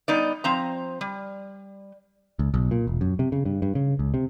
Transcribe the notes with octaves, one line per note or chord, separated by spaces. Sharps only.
G3 B3 D#4 D5
F3 C4 A#5
G3
C#2
B1
A#2
E1
F#2
C3
C#3
G2
G2
C#3
C#2
C3